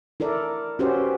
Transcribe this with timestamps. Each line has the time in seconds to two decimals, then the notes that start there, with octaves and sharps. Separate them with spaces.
0.20 E4 A4 A#4 D5
0.79 C#4 F#4 G4 B4 C5